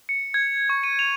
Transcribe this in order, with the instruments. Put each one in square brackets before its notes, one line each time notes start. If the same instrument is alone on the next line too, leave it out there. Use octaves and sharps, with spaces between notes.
[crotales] C#7
G#6
C#6
D#7
F7